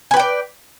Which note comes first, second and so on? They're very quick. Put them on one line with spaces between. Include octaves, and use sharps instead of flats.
G#5 B4 G5 D5